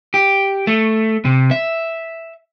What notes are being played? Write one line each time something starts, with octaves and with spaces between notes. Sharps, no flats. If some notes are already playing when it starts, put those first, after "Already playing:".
G4
A3
C3
E5